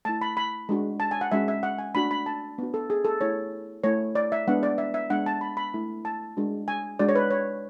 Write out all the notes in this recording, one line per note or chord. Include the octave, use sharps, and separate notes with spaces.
A3 E4 A5
B5
B5
G#3 D4 F#4
A5
G#5
F#5
G#3 C#4 F#4 E5
E5
F#5
G#5
A3 D4 F#4 B5
B5
A5
B3 D4 F#4
A4
G#4
A4
A3 E4 C#5
A3 E4 C#5
D5
E5
G#3 B3 D4 F#5
D5
E5
E5
G#3 B3 D4 F#5
A5
B5
B5
A3 E4
A5
G#3 D4 F#4
G#5
G#3 D4 F#4 D5
C#5
B4
C#5